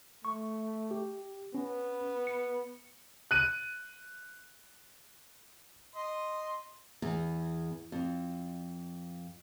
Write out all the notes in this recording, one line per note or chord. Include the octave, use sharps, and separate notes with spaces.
A3 C#6
G4
B3 C#4
C#7
F#6 D#7
D#5 C6
E2
F2